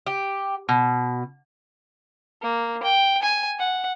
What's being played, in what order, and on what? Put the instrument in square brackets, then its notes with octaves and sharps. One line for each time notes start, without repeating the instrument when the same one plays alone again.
[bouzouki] G4
B2
[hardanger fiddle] A#3
G5
G#5
F#5